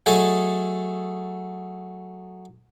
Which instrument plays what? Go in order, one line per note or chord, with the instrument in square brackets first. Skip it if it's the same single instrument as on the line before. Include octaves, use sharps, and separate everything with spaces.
[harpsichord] F#3 A3 G#4 A4 D#5